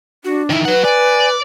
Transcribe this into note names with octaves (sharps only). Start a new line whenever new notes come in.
D4 F#4
D#3 D#4 E4
F#3 B4 F#5
D5 G#5